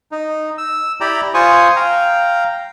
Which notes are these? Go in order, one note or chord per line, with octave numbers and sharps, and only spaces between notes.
D#4
E6
E4 G4 D5 G5 A#5 B5
F4 C5 G#5 C#6 D#6
F5 G5 A#5